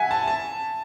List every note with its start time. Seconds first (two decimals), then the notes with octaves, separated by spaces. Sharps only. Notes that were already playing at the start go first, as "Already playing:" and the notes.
Already playing: E5 F#5 G#5
0.11 A5
0.27 A5